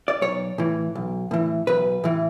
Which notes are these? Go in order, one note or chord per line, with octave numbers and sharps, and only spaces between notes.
D5
B1 C#5
A2 E3
B1
A2 E3
B1 B4
A2 E3